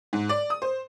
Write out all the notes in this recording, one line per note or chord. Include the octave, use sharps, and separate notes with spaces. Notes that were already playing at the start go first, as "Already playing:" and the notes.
G#2
D5
D#6
C5